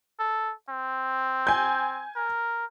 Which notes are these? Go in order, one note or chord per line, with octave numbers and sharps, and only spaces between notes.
A4
C4
G#5 G6
A#4